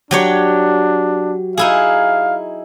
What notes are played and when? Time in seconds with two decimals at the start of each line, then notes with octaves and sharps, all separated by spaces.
0.11 F#3 D4 G4 C#5
1.57 D#4 E4 G#4 F5